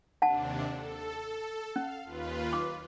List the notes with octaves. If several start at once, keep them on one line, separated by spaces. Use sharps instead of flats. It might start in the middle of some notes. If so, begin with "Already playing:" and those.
D#2 C3 D4 F#5 A5
A4
C#4 F5
D#2 F4 B4
D6